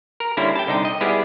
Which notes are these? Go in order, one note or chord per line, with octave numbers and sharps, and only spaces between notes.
A#4
D3 G3 A#3 C#4 E4
G5 A5
C2 D3 D#4 G5
D#5
G3 G#3 B3 E4 G4 G#4